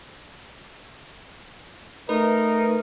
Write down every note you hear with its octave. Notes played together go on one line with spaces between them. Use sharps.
A3 D#4 A#4 B4